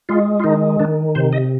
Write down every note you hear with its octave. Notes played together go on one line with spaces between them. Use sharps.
G#3 F4
F4
D#3 D#4
D#3 D4
C3 C5
D#5